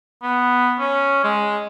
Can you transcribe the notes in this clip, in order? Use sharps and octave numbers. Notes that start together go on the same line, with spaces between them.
B3
C#4
G#3